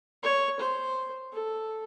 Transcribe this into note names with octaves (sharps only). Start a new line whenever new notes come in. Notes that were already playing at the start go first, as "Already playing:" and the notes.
C#5
C5
A4